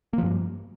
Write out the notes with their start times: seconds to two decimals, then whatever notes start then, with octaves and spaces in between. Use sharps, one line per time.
0.13 A#3
0.18 F3
0.23 G2